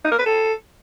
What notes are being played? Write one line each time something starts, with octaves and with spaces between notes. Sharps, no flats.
D#4
A#4
B4
A4